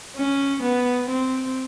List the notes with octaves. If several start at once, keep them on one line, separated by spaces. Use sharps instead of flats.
C#4
B3
C4